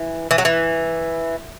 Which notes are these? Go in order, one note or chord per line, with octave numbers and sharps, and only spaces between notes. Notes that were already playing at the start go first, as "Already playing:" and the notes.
Already playing: E3
E3
F#3
E3